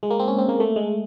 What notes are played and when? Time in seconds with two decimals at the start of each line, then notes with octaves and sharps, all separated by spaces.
0.03 G#3
0.10 A#3
0.19 C4
0.28 C#4
0.38 C4
0.49 A#3
0.60 A3
0.76 G#3